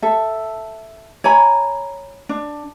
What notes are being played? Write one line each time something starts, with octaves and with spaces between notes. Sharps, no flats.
A4 E5
C#5 G#5 A#5 B5
D4